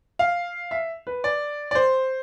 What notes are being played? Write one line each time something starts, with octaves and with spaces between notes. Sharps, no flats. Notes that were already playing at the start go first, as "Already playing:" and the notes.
F5
E5
B4
D5
D5
C5